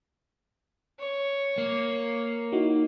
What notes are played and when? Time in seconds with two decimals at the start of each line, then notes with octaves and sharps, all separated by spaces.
1.00 C#5
1.58 A#3
2.52 D#4 E4 F#4